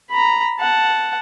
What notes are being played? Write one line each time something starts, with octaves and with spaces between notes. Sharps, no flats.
A#5 B5
F#5 A5